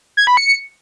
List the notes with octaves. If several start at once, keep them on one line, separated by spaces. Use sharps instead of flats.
G#6
B5
C#7